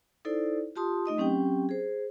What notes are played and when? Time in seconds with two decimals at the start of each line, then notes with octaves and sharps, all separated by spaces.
0.25 D#4 E4 A4 C5 D5
0.76 F4 G4 A5 C6 D#6
1.06 A3 D#4 D#5 D#6
1.18 F#3 C4 C#4 G4 G5
1.69 G#4 C5